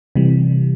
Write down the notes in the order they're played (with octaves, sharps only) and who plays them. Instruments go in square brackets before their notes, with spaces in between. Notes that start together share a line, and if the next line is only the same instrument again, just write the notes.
[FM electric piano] C3 E3 G3